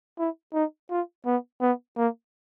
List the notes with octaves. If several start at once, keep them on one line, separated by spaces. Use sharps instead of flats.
E4
D#4
F4
B3
B3
A#3